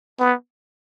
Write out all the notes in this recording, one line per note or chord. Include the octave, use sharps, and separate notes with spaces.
B3